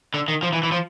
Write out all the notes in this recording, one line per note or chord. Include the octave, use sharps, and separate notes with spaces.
D3
D#3
F3
E3
E3
F3